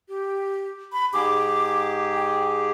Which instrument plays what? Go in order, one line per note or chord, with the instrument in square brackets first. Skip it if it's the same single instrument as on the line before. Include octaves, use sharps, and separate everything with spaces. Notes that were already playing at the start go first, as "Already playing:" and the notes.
[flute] G4
B5
[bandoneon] G#2 G4 G#4 [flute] D6
[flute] G5